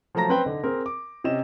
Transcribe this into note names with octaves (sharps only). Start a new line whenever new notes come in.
F3 F#3 A3 A5 A#5 A#6
C4 C#4 B4 C5 G5
D3 D#4
C4 G#4 A#4
D6
C3 C#4 D#5 E7